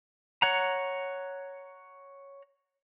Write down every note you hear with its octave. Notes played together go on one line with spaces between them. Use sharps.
C#5 F#5 A#5